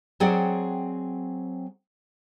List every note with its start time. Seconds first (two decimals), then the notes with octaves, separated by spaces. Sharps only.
0.20 F#3 C4 G#4 D5 F#5 G5